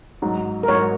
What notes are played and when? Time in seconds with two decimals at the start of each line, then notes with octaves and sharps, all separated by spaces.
0.22 G#2 F#3 D#4
0.63 A#4
0.68 G#2 F#3 D#4 C#5